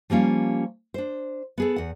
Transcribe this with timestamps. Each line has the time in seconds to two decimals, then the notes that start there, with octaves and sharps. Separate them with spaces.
0.10 F3 G3 A#3 C#4 F4
0.94 D4 C5
1.58 B3 G#4 A4
1.76 E2 F#5